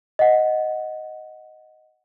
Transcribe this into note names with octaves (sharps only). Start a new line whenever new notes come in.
D#5 F#5